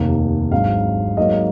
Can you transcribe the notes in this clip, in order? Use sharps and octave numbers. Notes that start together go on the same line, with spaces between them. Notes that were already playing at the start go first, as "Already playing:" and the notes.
Already playing: F1 D#2 D#3 A#3
G#1 G#2 F#3 D4 F5
G#2 F#3 A#3 D#4 D#5